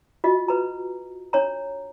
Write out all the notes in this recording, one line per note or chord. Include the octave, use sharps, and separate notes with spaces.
F4 F#4 D#5
B4 A#5
D4 C#5 A#5